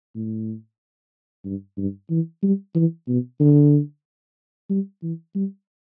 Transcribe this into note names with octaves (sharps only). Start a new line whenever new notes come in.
A2
G2
G2
E3
G3
E3
B2
D3
G3
E3
G3